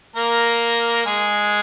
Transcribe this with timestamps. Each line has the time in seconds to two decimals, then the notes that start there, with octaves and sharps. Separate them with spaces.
0.16 A#3 A#4
1.06 G#3 G#4